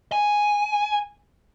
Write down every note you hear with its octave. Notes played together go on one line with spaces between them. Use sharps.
G#5